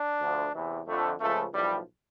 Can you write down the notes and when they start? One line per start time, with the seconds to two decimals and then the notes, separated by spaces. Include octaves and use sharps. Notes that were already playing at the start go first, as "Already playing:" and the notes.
Already playing: D4
0.21 D2 D3 F3
0.53 E2 C3 E3
0.87 F2 D3 F3 A3
1.20 C#2 C#3 F3 A3
1.53 B1 A2 F3 G3